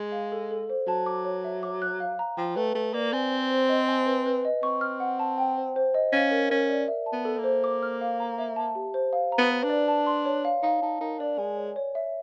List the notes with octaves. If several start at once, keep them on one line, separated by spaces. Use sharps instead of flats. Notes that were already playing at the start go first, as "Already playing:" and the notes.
Already playing: G#3
F5
A4
A4
C5
F#3 A5
D6
C#5
E5
D6
F#6
F5
A#5
F3 G5
A3 B4
A3 B4
A#3 D5
C4 G#5
C5
C5
D#5
G#5
B4
B4
D#5
C4 C#6
F6
F#5
A5
G5
C5
C5
D#5
C#4 F5
A#4
C#4 A#4
D5
E5
A5
B3
A4
A#3
C5
D6
F6
F5
A#5
E5
A5
G4
C5
F5
A#5
B3
B4
D4
D5
A5
C6
C#5
F5
D#4 F5
D#4 A5
D#4 A#4
D4 D5
G#3 G#5
C#5
C#5
E5